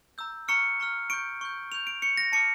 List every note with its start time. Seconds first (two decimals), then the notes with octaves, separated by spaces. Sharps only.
0.18 A#5 E6 G6
0.48 A#5 C#6 F6 C#7
0.80 A#5 C#6 F6
1.10 C#6 G6 D7
1.41 C#6 G6
1.72 C#6 G6 F7
1.87 D7
2.02 C#6 G6 C#7
2.17 A#6
2.32 A5 D6 F6 C#7